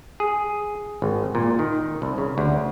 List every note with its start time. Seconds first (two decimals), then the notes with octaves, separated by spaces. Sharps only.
0.20 G#4
1.02 G#1
1.35 A#2
1.59 D#3
2.02 C2
2.18 C#3
2.38 D2